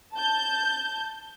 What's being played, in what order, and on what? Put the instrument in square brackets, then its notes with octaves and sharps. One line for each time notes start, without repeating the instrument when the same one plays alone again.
[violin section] A5 G6